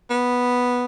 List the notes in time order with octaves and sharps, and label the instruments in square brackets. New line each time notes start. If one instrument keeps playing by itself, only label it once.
[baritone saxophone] B3